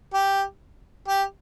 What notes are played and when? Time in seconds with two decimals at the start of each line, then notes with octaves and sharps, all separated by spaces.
0.13 G4
1.08 G4